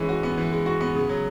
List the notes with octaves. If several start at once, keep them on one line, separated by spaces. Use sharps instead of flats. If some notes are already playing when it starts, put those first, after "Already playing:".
Already playing: E3 G#3 C#4
F#4
B3
E3
G#3
F#4
B3
C#3
F#3